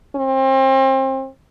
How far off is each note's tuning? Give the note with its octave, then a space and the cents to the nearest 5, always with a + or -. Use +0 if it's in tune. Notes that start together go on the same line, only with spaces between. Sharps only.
C4 +30